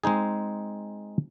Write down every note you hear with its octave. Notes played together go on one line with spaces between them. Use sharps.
G#3 C4 D#4 G#4